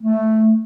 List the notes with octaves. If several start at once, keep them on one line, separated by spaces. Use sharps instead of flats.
A3